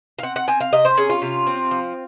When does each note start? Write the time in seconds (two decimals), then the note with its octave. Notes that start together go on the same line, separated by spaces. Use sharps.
0.19 F5
0.23 C4 F#5
0.36 F#5
0.48 C4 G#5
0.61 F5
0.72 C3 D#5
0.85 C5
0.97 C#4 G#4
1.09 F4
1.22 C3
1.47 C4
1.71 F3